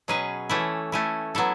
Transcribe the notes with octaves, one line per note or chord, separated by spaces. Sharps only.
B2 F#3 C#4 G#4 B4
E3 A3 C#4 E4
A3 C#4 E4
F#3 B3 E4 A4